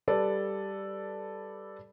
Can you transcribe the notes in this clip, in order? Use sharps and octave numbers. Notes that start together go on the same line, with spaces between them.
G3 A4 B4 D5